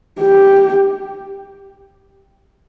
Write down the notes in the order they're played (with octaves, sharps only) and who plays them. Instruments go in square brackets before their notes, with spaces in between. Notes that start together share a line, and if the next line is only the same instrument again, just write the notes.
[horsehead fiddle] G4